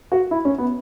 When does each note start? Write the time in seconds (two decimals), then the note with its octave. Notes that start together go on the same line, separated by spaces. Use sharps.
0.12 F#4
0.31 E4
0.45 C#4
0.58 B3